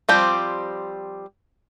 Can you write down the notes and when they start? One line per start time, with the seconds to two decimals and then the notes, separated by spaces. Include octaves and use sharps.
0.09 F3 G3 C4 G4